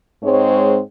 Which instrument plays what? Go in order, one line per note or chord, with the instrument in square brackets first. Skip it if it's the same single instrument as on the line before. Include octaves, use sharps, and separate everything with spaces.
[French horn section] G#2 G#3 C4 C#5